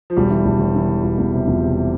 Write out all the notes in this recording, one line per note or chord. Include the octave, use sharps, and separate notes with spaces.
F3
E1 G3
E3
E1
E1
E3
E3
E1
E2
C3
E2 F3
C3